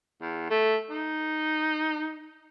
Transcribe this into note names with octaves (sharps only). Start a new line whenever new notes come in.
E2
A3
D#4